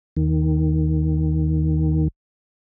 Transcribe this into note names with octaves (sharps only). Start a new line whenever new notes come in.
D#2 D#3